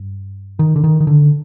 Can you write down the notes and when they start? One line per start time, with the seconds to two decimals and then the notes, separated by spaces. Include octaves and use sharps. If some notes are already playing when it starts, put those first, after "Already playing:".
Already playing: G2
0.59 D#3
0.76 D3
0.84 D#3
1.00 D#3
1.07 D3